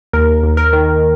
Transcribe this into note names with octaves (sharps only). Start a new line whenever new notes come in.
D#2 A#4
D#2
A#4
D#3